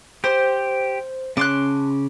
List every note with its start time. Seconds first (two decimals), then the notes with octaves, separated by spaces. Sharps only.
0.24 G4 C5
1.37 C#3 C#4 A5 C6 D6 F#6